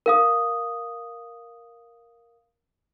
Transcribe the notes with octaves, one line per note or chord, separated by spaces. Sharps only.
A#4 F5 D#6